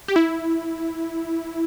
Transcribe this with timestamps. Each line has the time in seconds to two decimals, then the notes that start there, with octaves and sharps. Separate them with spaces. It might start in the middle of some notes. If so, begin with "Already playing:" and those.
0.08 G4
0.16 E4